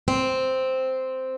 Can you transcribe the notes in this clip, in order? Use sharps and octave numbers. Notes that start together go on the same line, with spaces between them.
C4